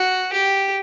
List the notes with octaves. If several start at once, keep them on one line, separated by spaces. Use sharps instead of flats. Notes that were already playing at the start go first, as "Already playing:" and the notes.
Already playing: F#4
G4